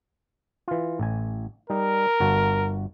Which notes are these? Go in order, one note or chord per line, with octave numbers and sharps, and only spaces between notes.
E3 F4
A1 G#5
G3 D#4 A#4
G1 F#4 A5